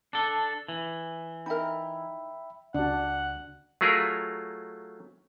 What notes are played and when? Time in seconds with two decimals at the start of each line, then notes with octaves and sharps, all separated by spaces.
0.13 D4 A4
0.68 E3
1.46 D#4 A#4 E5 G5 B5
2.75 C#2 D4 F#4 F#5
3.81 F#3 A3 F4 G#4 A#4